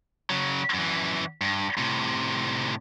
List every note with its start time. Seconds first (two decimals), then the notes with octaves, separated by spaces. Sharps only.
0.30 C#3 F#3
0.74 F#2 E3
1.41 G2
1.78 A2 C3